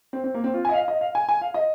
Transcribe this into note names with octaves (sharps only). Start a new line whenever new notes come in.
C4
C4
A#3
C4
F4
G#5
D#5
F5
D#5
F5
G#5
G#5
F5
D#5